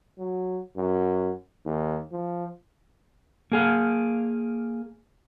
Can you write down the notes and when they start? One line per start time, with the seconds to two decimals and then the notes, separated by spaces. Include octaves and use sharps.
0.18 F#3
0.77 F#2
1.65 D#2
2.12 F3
3.52 A#3 G#4 F5